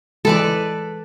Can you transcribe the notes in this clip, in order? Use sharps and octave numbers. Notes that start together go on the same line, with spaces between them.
E3 G#3 A4 B4 D5